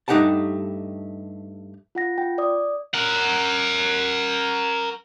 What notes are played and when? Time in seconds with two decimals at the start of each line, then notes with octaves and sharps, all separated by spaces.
0.08 G2 A3 D#4 G4 F#5 A5
1.95 F4 F#5 A#6
2.18 F4 G5
2.38 D5 D#6
2.94 A#4 F#5